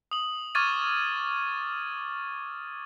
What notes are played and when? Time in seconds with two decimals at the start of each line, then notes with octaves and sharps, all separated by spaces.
0.11 D#6 F#7
0.55 C#6 D6 F6 G#6 A6 D#7